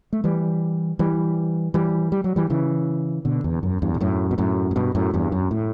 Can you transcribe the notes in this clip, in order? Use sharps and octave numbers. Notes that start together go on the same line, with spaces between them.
A3
E3 G3
E3 G3
E3 G3
G3
F#3
E3 G3
C#3 E3
B2 D3
E2
F#2
E2 G2
B2
F#2 A2
B2
F#2 A2
A2
G2 B2
F#2 A2
E2 G2
F#2
A2